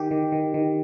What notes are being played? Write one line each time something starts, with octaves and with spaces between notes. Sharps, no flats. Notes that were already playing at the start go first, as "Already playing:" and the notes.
Already playing: D#3 G4
D#3
D#3
D#3